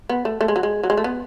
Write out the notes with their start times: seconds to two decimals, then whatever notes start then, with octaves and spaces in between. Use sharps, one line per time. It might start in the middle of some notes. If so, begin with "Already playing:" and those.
0.09 B3
0.25 A3
0.41 A3
0.48 G#3
0.56 F#3
0.63 G#3
0.83 F#3
0.90 G#3
0.97 A3
1.04 B3